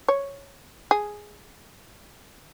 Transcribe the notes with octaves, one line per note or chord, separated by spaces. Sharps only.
C#5
G#4